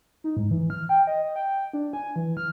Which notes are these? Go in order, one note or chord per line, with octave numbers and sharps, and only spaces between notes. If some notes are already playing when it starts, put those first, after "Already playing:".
D#4
G#2
E3
F6
G5
D#5
G5
D4
G#5
E3
F6